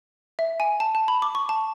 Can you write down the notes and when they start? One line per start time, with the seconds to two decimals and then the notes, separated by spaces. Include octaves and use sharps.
0.39 E5
0.60 G#5
0.80 A5
0.95 A5
1.08 B5
1.22 D6
1.35 C#6
1.49 A5